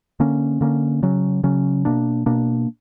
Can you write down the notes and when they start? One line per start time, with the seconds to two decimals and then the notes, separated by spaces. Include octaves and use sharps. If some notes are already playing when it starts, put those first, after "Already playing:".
0.20 D3 A#3 C#4
0.61 D3 A#3 C#4
1.03 C#3 F#3 C#4
1.44 C#3 F#3 C#4
1.85 B2 A#3 D4
2.26 B2 A#3 D4